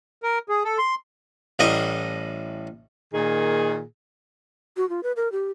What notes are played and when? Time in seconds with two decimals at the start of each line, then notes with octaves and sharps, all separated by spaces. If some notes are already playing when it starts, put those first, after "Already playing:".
0.23 A#4
0.49 G#4
0.65 A4
0.78 C6
1.59 A1 A2 G3 D#5 A#5 D#6
3.12 A#2 D#3 G#4
4.77 F#4
4.89 F4
5.03 B4
5.16 A#4
5.32 G4